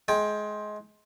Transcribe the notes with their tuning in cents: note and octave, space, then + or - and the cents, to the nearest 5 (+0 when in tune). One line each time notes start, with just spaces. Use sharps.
G#3 +25 G5 +10